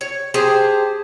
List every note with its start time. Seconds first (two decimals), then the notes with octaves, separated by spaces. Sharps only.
0.01 C#5
0.34 G4 G#4 C5 A5